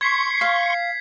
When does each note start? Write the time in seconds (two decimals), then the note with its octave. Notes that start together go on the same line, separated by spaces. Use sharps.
0.01 C6 C#6 G#6 B6 C7
0.41 F5